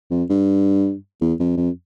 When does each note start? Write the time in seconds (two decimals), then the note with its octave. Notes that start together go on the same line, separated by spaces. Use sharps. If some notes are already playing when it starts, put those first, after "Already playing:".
0.11 F2
0.30 G2
1.21 E2
1.40 F2
1.57 F2